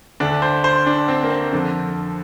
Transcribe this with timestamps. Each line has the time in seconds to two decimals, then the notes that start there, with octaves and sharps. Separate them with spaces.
0.20 D2 D3 D4
0.42 C5
0.64 C5
0.86 D4
1.08 C4
1.23 A#3
1.30 C4
1.53 F2 D3